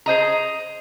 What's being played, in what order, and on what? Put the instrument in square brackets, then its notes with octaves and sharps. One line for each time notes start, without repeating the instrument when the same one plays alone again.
[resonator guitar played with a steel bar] G#4 C5 D#5 A#5